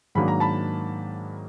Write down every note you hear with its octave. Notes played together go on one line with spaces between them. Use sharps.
G#2 D#3 F#3 A#3 D4 B5
A#5
A5 B5